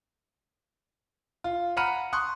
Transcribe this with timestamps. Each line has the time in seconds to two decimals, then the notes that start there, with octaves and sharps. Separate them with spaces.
1.44 F4
1.77 F#5 A#5 B5 F6 C#7 D#7
2.13 C6 C#6 D#6 F#6